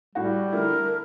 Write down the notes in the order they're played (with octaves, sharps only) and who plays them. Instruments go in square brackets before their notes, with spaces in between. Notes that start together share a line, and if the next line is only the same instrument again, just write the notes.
[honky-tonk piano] A2 F#4 [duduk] G3
[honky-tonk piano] D3 A3 E4 [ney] A#4